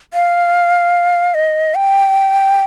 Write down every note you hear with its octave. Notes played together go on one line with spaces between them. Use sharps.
F5
D#5
G5